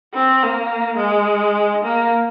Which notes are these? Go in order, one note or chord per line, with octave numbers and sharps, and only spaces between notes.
C4
A#3
G#3
A#3